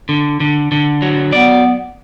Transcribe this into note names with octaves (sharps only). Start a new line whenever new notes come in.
D3
D3
D3
F#3
B3 D5